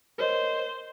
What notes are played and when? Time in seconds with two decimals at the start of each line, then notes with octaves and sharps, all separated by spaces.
0.18 A#4 C5 C#5 D#5